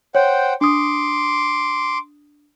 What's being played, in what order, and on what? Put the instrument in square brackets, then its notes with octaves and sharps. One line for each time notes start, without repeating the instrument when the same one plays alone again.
[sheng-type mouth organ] C5 F#5 G5 [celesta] C#5
[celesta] D4 D#6 [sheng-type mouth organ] C6 D6